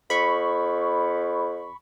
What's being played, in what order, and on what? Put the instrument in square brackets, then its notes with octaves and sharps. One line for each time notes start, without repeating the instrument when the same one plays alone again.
[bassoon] F2 [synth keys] B5 C#6